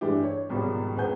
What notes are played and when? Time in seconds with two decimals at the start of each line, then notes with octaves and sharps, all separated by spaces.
0.01 G2 E3 A3 D4 E4 G4
0.24 C#5
0.49 G#1 C#2 B2 F3 G3
0.96 D#1 C#2 B3 F#5 G#5 G6